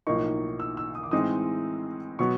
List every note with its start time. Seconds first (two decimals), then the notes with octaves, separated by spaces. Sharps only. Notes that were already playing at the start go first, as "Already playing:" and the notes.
0.07 B1 A2 F3 A#3 D#4 C#6
0.60 E6
0.77 E6
0.95 D#6
1.03 D6
1.11 A2 E3 G#3 C4 D#4 D#6
2.19 B2 F#3 B3 C#6